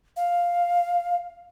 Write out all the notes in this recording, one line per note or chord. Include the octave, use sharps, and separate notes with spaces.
F5